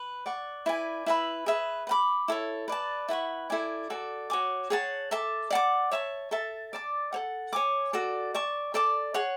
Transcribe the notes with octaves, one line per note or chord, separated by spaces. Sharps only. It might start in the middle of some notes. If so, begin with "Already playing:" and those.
Already playing: B4
D5 F#5 C#6
E4 B4 D5 G#5
E4 B4 E5 B5
G#4 B4 E5
B4 F#5 B5 D6
E4 A4 C#5
B4 D5 A5
E4 B4 F#5 C#6
E4 A4 D5 G#5
F#4 A4 D5
F#4 C#5 G#5 D6
G#4 C#5 F#5 A5
A4 E5 A5 D6
D5 F#5 A5 D6
C#5 E5 A5 C#6
A4 E5 A5
D5 A5 D6
A4 C#5 F#5
C#5 G#5 D6
F#4 A4 D5
D5 A5 C#6
A4 D5 A5 D6
G#4 C#5 F#5